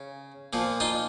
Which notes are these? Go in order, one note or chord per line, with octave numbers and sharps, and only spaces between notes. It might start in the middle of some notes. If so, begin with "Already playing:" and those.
Already playing: C#3
A#2 F3
D#4 F4